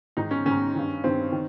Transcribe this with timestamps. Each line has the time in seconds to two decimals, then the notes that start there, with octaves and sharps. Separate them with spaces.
0.17 G#2 D#3 D#4
0.31 C#4
0.45 G#2 D#3 C#4
0.75 G2 D#3
1.04 G2 D#3 C4
1.32 D#3